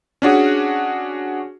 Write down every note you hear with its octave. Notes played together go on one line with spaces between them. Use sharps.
C#4 D4 F#4 G#4